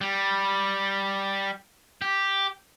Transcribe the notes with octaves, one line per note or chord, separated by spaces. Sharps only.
G3
G4